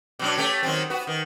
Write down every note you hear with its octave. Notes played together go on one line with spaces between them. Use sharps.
B2 F#3 D4
A3 C#4 G4
D#3 F#3 C4
B3 F#4
D#3